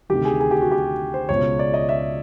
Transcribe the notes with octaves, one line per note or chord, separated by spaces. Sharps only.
D2 C3 D#3 G4
G#4
G#4
G4
F#4
G4
C5
C#2 B2 C#5
D5
D#5
E5